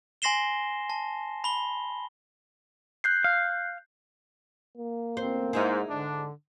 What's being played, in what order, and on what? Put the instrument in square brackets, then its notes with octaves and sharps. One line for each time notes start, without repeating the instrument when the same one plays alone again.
[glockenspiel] G#5 C6 A#6 C7 E7 G7
A5
B5 G7
[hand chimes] F#6 G6 C7
[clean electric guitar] F5
[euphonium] A#3
[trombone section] A1 D2 [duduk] C4 [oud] C5
[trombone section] G#2 [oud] D#4 E4 G#4 [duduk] C5
[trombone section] G#2 G#3 D4 [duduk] D3